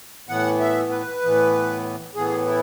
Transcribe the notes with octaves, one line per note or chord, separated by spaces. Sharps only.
A2 E3 B3 F#5
E5
B4
A2 E3 B3
A2 E3 B3 G#4
E4